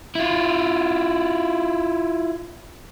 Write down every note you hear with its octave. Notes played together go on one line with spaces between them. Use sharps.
E4 F4